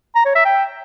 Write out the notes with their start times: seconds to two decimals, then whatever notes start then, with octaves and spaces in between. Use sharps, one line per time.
0.15 A#5
0.25 C#5
0.35 E5
0.45 G5